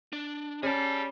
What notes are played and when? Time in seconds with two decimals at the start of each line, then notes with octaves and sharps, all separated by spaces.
0.13 D4
0.63 G3 C#4 G#4 A5